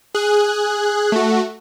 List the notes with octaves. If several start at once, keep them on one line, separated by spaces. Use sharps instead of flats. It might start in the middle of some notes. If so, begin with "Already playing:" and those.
G#4 F#6
A3 F#4